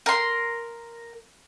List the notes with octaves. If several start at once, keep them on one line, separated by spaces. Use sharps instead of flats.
A#4 C6